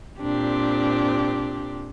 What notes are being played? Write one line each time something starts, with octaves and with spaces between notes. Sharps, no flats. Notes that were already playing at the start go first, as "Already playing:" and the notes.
A#2 C4 D4 G4